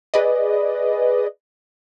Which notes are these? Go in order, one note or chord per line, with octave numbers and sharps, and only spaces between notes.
G#4 B4 D5 D#5